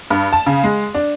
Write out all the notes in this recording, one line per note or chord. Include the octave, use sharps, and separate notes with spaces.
G2
A5
C#3
G#3
D4